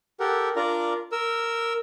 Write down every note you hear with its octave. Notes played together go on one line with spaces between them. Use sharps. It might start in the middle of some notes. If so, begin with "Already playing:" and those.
G4 A4 A#4 F#5
D4 F4 A#4 D5 A#5
A#4 E6